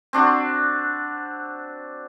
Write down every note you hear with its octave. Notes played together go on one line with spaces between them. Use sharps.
C4 D4 F#4